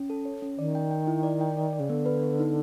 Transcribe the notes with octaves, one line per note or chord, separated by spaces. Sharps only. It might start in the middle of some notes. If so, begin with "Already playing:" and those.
Already playing: C#4
A4
C#5
C#4
D#3 D5
G5
G5
E4
D5
G5
D5
D5
C#3
D3 B3
B4
B3
D#4